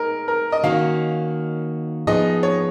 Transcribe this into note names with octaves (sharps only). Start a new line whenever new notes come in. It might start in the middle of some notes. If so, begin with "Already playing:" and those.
Already playing: G#3 D#4 G#4 A#4 B4
A#4
D#5
D#3 A#3 C#4 F#4 F5
F3 B3 D#4 G#4 D#5
C#5